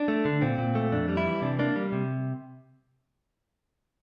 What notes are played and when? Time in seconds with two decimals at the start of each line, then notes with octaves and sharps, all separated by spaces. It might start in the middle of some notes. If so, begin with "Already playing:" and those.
Already playing: D4
0.08 A3
0.25 D3
0.42 A#2 C4
0.58 A#2
0.75 A3
0.92 F2 D4
1.09 G3
1.17 E4
1.26 E3
1.42 C3 D4
1.59 A#3 D4
1.76 G3
1.92 C3